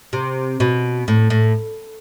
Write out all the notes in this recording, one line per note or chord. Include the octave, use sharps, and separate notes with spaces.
C3
B2
A2
A2